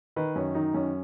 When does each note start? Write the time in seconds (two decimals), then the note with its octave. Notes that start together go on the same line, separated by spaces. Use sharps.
0.16 D#3 B4
0.35 F#2 C#4
0.54 D#3 D#4
0.74 F#2 C#4